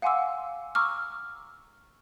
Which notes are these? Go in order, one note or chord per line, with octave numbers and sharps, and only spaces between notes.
F5 F#5 G#5 C6 D6 E6
A#5 C#6 D6 E6 F6